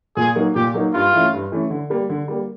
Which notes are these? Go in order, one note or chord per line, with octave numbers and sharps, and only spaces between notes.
A#2 G#4
F#3 A#3 D#4
A#2 G4
F#3 A#3 D#4
G2 F4
E3 A3 C#4
G2
E3 A3 C#4
D3
G3 A#3
D3
G3 A#3